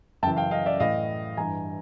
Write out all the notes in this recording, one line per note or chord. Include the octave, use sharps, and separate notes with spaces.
F#2 C#3 E3 G5 A5
F5 G5
D#5 F5
D5 E5
A2 E3 D#5 F5
G2 E3 G#5 A#5